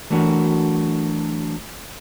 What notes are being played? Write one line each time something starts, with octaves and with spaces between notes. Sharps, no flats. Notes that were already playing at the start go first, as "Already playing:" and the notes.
E3 F#3 A3 D4 F#4 A#4